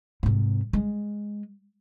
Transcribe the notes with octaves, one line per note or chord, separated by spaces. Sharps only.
G#2 C3
G#3